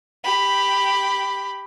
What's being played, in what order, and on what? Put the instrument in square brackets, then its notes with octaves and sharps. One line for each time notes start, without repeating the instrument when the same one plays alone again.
[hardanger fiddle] G4 B5